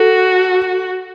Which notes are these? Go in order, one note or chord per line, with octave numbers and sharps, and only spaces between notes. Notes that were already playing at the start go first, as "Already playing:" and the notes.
Already playing: F#4 A4